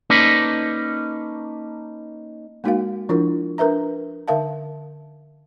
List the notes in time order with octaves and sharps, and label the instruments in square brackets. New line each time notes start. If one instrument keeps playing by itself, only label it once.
[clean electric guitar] A#3 C#4 D#4 A4 B4 D5
[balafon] G#3 A#3 D#4 F#4 A#4 F5
F3 D4 E4 F4 A#4
D4 A#4 B4 E5 A#5
D3 D#4 A#4 E5 F5 A5